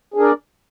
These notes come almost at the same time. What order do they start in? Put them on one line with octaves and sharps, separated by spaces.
G#4 D4 A#4 D5